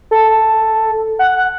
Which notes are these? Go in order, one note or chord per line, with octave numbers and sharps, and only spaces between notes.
A4
F#5